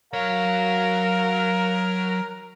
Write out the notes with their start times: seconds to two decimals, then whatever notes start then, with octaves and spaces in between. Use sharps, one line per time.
0.13 F#3 A#4 C#5 F5